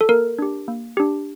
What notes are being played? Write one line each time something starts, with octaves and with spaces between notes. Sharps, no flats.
A4
A#3 A#4
D4 G4
A#3
D4 G4